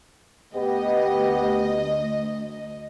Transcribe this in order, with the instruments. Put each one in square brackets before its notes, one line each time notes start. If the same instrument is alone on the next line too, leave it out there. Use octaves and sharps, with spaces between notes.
[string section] D2 D#5 [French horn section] B3 G4